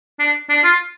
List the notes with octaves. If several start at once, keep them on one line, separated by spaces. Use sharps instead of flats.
D4
D4
F4